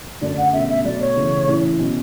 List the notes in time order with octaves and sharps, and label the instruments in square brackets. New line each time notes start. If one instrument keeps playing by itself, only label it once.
[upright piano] F#2 D3 A3 D4 [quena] D5
[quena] F#5
[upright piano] B2 A3 C#4 [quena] E5
[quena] E5
[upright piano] B2 F#3 A3 [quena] D5
[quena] C#5
[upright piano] C#3 E3 A3
A2 E3 A3 C#4 E4
B2 F#3 C#4